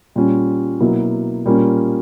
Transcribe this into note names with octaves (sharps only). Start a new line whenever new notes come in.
A#2 G3 C#4
B2 F#3 A#3 E4
A#2 G3 A#3 C#4